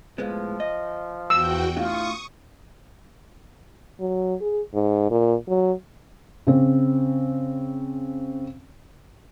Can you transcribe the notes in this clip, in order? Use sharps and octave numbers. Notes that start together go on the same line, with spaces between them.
A2 F3 G#3 B3
D#5
E2 F#4 G5 E6
A2 D4 F4 C#6 D#6
F#3
G#4
G#2
A#2
F#3
C#3 C4